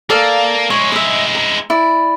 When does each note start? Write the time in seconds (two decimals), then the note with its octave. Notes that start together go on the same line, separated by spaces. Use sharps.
0.10 A#3 A4 D5 F5
0.70 G#3 E4 C#5
0.92 D#5 E5
1.35 A#5
1.70 E4 D5